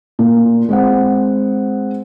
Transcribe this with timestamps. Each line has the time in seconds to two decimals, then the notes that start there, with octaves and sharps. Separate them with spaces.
0.19 A#2
0.69 G#3 C4 F#5